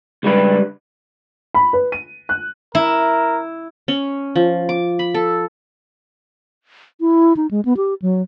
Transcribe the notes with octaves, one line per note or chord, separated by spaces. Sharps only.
C#2 G3 D4 B4
B5
B4
D#7
F#6
E4 A#4
C#4
F3
D6
B5
A4
E4
D#4
G#3
B3
G4
F#3